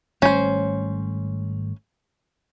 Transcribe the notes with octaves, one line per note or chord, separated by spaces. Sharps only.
G#1 G3 A3 C#4 C5